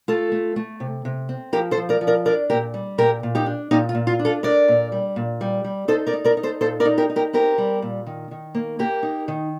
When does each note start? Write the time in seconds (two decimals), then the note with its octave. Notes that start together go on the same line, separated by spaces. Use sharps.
0.08 A3 F4 A4
0.32 A3
0.56 A3
0.80 C3
1.05 C3
1.29 C4
1.53 F3 G4 A#4
1.71 A4 C5
1.77 F3
1.89 A#4 D5
2.01 F3
2.07 A#4 D5
2.25 D4 A#4 D5
2.50 A#2 G4 A#4
2.74 G3
2.98 A#2 G4 A#4
3.23 A#2
3.35 D#4 G4
3.46 D4
3.71 A#2 D#4 G4
3.89 F4
3.95 A#2
4.07 F4
4.19 D4
4.25 F4 A4
4.43 D4 A#4 D5
4.68 A#2
4.92 G3
5.16 A#2
5.41 G3
5.64 G3
5.88 D#4 A4 C5
6.07 A#4 D5
6.14 D#4
6.25 A#4 D5
6.37 D#4
6.43 A4 C5
6.61 A#2 A4 C5
6.80 A#4 D5
6.85 D#4
6.98 G4 A#4
7.10 D#4
7.16 G4 A#4
7.33 C4 G4 A#4
7.58 G3
7.82 A#2
8.07 D#3
8.31 D#3
8.55 A#3
8.79 A#3 G4 A#4
9.03 D#4
9.28 D#3